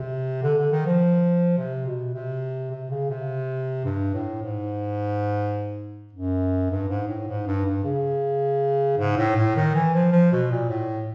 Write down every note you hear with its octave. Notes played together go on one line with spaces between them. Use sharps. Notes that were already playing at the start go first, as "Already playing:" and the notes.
Already playing: C3
D3
D3
D#3
F3
C3
B2
C3
C3
C#3
C3
G2
A2
G#2
F#2
G2
G#2
A2
G#2
G2
G2
C#3
G#2
A2
A2
D#3
E3
F3
F3
B2
A#2
A2